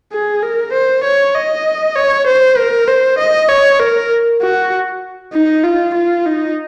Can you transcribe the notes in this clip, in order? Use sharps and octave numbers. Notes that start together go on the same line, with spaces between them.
G#4
A#4
C5
C#5
D#5
C#5
C5
A#4
C5
D#5
C#5
A#4
F#4
D#4
F4
F4
D#4